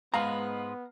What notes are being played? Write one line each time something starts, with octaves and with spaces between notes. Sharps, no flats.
G#2 G#3 B3 B4 F5 A#5